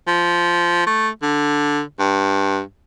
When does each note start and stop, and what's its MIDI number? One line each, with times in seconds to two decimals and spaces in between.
0.08 0.86 53
0.87 1.09 57
1.22 1.81 50
1.99 2.60 43